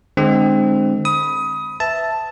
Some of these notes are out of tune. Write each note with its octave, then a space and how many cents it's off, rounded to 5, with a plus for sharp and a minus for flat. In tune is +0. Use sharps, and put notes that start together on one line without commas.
D3 +40 G#3 +0 C4 +0
B5 +0 D#6 +20
B4 +20 E5 +0 A5 +0